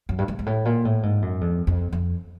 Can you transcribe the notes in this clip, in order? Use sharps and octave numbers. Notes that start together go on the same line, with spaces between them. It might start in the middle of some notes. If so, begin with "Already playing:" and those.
F#2
G2
G#2
G#2
A2
A#2
A2
G#2
F#2
F2
F2
F2